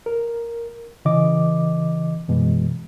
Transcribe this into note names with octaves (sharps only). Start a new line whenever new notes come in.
A#4
C#3 E3 D#5 D6
F#2 B2 E3 G#3